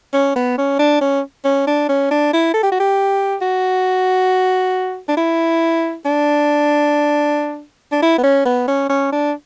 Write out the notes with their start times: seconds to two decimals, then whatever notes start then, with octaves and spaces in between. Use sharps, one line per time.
0.13 C#4
0.36 B3
0.58 C#4
0.79 D4
1.01 C#4
1.45 C#4
1.67 D4
1.89 C#4
2.11 D4
2.33 E4
2.54 A4
2.63 G4
2.72 F#4
2.80 G4
3.41 F#4
5.08 D4
5.17 E4
6.05 D4
7.92 D4
8.02 E4
8.18 B3
8.24 C#4
8.45 B3
8.68 C#4
8.89 C#4
9.12 D4